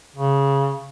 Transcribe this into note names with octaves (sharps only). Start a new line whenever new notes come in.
C#3